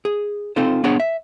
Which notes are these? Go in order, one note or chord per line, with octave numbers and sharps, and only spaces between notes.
G#4
C4 D#4 F4 A4 C5
B3 D4 G#4 C#5 F#5
E5